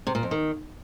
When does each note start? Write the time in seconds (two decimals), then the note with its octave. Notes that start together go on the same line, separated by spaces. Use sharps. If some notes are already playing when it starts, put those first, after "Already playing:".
0.07 C3
0.15 A#2
0.23 F2
0.31 D#3